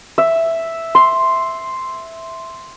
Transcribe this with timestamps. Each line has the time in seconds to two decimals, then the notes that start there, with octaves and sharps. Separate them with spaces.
0.18 E5
0.95 C6